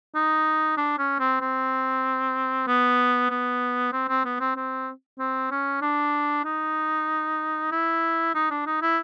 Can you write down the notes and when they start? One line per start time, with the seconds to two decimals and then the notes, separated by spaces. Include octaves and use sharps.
0.15 D#4
0.77 D4
0.98 C#4
1.19 C4
1.41 C4
2.67 B3
3.30 B3
3.92 C4
4.09 C4
4.25 B3
4.40 C4
4.56 C4
5.19 C4
5.51 C#4
5.81 D4
6.45 D#4
7.71 E4
8.34 D#4
8.51 D4
8.66 D#4
8.82 E4